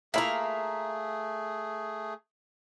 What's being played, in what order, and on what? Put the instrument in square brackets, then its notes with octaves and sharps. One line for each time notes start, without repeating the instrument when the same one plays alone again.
[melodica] A3 G#4 [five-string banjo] A#3 E4 F4 [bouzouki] E5 A#5